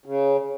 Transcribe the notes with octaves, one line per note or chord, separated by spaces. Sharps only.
C#3